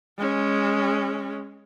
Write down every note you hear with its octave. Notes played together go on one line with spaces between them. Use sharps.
G#3 C#4